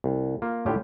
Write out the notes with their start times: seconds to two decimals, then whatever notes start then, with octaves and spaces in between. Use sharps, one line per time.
0.04 C2
0.42 A#3 F4
0.66 A2 D3 C#4 F4 G4